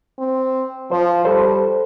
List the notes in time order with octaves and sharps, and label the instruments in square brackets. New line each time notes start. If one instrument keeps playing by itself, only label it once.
[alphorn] C4
[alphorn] F3 [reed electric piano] C5
[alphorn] G3 [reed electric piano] A4 C5